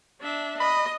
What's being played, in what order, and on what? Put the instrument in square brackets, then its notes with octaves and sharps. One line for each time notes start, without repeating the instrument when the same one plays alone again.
[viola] D4 E5
[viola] D#5 [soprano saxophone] B5